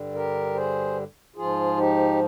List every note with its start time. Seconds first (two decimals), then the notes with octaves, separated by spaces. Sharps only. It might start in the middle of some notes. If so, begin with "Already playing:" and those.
Already playing: G2 D3 G3
0.14 G4 A#4
0.54 G#4 C5
1.36 G#2 F3 F4 G#4
1.76 D#4 G4